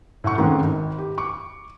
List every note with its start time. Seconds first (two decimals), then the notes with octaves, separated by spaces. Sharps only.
0.24 A2 E5 F#5 C#6
0.38 G#2 D#3 A3 C4 C#4
0.61 G#1
0.98 G4
1.18 C#6 D6